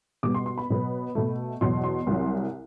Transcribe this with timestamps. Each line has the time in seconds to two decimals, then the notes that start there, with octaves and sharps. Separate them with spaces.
0.23 B2 G3 B3 D6
0.35 C6
0.46 C6
0.58 B5
0.70 B2 F#3 B3
1.15 B2 A3
1.61 E2 B2 F#3 C6
1.84 C6
2.07 C2 C3 F#3